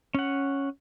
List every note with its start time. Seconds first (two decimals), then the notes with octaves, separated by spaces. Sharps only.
0.15 C#4 F#5